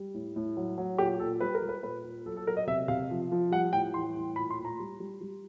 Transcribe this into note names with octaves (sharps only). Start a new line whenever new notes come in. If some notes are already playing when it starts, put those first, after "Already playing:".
Already playing: G3
A2
A2
F#3
F#3
A#2 G4
A#2 A4
G3 B4
A#4
G3
B4
A#2 B4
A#2
F#3 A4
A4
F#3 A#4
D#5
C3 E5
C3 F5
F3
F3
G3 F#5
A2 G5
E3 C6
A2
A#2 B5
C6
A#2
A#5
G3
G3
G3